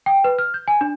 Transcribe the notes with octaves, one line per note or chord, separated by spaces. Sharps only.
G5
B4
F6
G6
G#5
D4